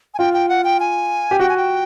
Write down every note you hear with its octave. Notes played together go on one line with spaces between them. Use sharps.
G#5
F4 G5
G5
F#5
G5
G#5
G4
F#4 G5
G#5
G5